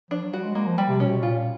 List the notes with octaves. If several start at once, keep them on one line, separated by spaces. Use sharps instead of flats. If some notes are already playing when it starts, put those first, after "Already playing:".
F3 D4
F#3
G3 F#4
G#3
G#3 A#3
F3
G3
C3
B2 C#4
A#2 F4